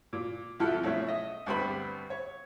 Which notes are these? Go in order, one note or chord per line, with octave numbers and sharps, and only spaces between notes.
A#2
C2 F3 E4 A4 F#6
B1 A3 C#4 E4
D#5 E5
D2 G2 G3 B3 C4 B5
C#5